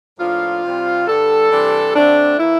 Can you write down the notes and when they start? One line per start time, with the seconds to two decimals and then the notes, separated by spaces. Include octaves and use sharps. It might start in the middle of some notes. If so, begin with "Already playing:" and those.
0.19 A2 F3 A#3 D4 F4
0.63 C3 G3 C4
1.07 G2 D3 G3 A4
1.51 C3 E3 G3 D4
1.95 D2 D3 A3 C4 D4
2.39 E3 A#3 E4